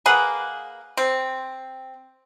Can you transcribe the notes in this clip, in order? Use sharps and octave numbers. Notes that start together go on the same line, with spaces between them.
A#3 G#4 B4 F#5
C4